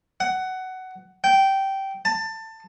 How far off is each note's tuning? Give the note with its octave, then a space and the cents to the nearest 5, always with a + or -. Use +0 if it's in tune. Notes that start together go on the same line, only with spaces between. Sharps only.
F#5 +15
G5 -15
A5 +20